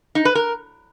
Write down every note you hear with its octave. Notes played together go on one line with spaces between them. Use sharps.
D#4
B4
A#4